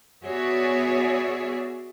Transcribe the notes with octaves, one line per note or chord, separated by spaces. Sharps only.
B3 F#4 G#4 C#5 D5 E5